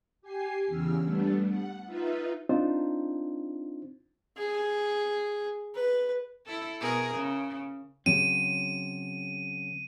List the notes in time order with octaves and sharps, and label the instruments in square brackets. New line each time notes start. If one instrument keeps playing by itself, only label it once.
[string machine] G4 G#5 C7
E2 C#3 E6 F6
G3 A3 B3 D4
F#5
D#4 F4 B4 E5
[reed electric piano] C4 D4 D#4 F4 C5
[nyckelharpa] G#4
B4
[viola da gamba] E4 A4
B2 G#4 A#4
C#3
[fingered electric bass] C#3 F#3 C4 [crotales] D#7